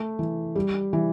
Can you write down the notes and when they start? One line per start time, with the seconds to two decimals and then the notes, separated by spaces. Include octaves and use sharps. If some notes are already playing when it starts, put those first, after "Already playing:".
Already playing: A3
0.19 E3
0.56 G3
0.93 E3